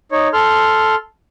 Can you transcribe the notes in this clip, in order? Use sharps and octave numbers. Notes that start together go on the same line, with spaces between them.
D#4 C#5
A4 C6 F6